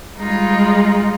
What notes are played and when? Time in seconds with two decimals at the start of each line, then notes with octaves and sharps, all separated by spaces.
0.14 G3 G#3 D#4 F4